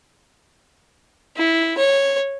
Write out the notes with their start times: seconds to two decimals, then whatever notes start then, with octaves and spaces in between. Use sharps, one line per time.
1.37 E4
1.77 C#5